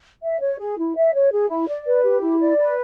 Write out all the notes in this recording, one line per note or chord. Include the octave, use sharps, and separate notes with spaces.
E5
C#5
G#4
E4
E5
C#5
G#4
E4
D5
B4
G4
E4
D5
B4